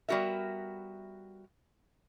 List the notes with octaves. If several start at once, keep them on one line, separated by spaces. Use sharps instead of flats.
G3 B3 F#4 A#4 E5